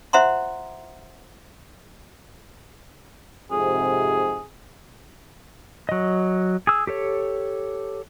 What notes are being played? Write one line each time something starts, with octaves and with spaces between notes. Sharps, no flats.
F4 C5 E5 F#5 A#5 C6
F2 G#2 C3 G#4
F#3 D#5
G#4 E6
G4 A4 C#5